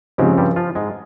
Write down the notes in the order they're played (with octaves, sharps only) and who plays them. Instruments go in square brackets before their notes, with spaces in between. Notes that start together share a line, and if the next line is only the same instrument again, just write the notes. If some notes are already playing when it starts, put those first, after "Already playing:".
[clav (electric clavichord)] G#2 G#3 [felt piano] C#3 F3 C4 G4
[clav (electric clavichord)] G2 G3
F3 F4
G#2 G#3